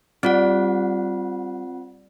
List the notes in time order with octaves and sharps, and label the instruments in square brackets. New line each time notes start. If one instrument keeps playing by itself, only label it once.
[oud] G3 [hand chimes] C4 F4 F#5